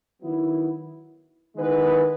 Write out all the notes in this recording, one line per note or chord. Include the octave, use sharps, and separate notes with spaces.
D#3 F#3 B3 E4
D#3 G#3 B3 E4 B4